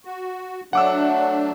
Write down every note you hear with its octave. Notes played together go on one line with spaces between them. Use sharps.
F#4
F#3 A3 D4 F#5 D6 E6